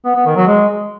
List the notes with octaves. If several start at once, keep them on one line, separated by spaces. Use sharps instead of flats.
B3
B3
D#3
F#3
G#3